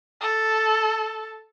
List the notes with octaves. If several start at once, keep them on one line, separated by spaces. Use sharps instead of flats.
A4